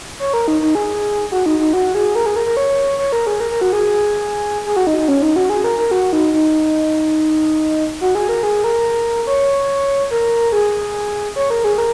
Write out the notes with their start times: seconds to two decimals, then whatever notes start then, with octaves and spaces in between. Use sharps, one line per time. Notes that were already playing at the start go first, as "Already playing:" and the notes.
0.20 C#5
0.34 A#4
0.48 D#4
0.62 D#4
0.75 G#4
1.32 F#4
1.46 D#4
1.59 D#4
1.73 F#4
1.95 G#4
2.15 A#4
2.26 G#4
2.36 A#4
2.46 A#4
2.57 C#5
2.99 C#5
3.12 A#4
3.27 G#4
3.40 A#4
3.51 A#4
3.61 F#4
3.73 G#4
4.67 G#4
4.76 F#4
4.87 D#4
4.98 D#4
5.08 C#4
5.22 D#4
5.36 F#4
5.50 G#4
5.64 A#4
5.78 A#4
5.91 F#4
6.13 D#4
6.34 D#4
8.01 F#4
8.15 G#4
8.29 A#4
8.43 G#4
8.64 A#4
9.27 C#5
10.10 A#4
10.52 G#4
11.36 C#5
11.50 A#4
11.64 G#4
11.78 A#4